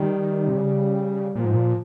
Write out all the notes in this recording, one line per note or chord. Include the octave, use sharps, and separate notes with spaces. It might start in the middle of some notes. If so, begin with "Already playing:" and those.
Already playing: D#3 G3
C3
C#3
A#2 F3
G#2
A#2